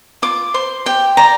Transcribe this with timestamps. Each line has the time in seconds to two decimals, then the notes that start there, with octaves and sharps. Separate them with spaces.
0.22 F4 D6
0.54 C5 C6
0.86 G4 G5
1.17 D5 A#5